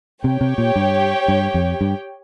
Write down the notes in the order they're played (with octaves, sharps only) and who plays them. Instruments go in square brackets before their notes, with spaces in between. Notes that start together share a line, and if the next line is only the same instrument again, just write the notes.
[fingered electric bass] C3 [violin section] G4 C#5 G5
[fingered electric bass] C3
A#2
G2
G2
F2
G2